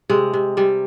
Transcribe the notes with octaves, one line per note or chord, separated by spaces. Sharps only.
C3 G#3
C3
C3 G3